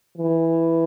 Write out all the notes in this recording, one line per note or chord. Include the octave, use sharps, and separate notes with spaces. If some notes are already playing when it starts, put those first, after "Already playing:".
E3